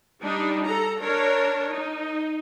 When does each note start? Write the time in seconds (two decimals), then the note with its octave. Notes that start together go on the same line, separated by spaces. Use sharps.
0.22 G3 D4 D#4
0.66 A4 A#5
1.03 D4 A#4 C#5
1.72 D#4